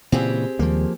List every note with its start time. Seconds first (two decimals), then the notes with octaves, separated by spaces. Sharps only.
0.12 A#2 C#3 E3 C4 G4 G#4
0.59 D#2 F3 G3 G#3 A#3